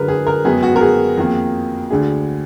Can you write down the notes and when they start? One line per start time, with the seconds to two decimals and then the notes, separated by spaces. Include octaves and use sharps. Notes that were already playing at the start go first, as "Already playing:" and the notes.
Already playing: F#2 D3 G#3 A#4 B4
0.08 G#4
0.27 A#4
0.45 F#2 D#3 G#3 B3 G#4
0.63 F#4
0.76 A#4
0.81 G#4
1.17 F2 D#3 A#3
1.90 D2 D3 G#3 D4 G#4